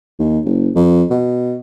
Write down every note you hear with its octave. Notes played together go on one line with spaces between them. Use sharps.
D#2
F#1
F2
B2